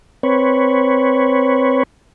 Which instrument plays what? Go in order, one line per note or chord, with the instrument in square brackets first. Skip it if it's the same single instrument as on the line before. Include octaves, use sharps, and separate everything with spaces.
[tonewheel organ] C4 B4 C#5